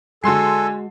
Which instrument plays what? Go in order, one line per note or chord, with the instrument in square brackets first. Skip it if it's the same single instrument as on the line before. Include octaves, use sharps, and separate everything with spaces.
[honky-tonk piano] D3 C6 C7 [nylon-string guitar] G#3 F#4 [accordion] A4 [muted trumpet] G#5